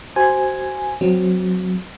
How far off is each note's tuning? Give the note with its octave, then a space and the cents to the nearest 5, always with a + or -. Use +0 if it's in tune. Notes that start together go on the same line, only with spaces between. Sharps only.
F#4 +30 C5 +0 G#5 +0
F#3 -10 C4 -5